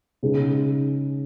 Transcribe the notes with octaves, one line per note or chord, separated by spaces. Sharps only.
C#3 G#3 D#4